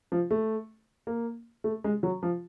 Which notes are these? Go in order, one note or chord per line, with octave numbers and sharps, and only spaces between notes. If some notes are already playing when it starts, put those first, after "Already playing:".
F3
A3
A#3
A3
G#3
F#3
F3